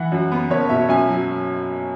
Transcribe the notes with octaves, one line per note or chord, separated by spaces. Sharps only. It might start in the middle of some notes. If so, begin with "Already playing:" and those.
Already playing: E3 F#5
F#2
B3
F#1 C#5
B2 E5
F#2 E5 G#5
F#3